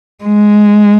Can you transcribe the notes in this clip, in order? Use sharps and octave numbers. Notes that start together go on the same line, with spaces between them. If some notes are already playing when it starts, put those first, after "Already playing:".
G#3